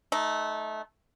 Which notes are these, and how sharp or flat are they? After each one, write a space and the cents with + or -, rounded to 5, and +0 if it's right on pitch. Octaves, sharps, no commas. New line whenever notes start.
A3 -20 D#4 +0